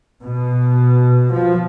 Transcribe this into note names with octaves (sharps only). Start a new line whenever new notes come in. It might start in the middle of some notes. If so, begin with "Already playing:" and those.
B2
F3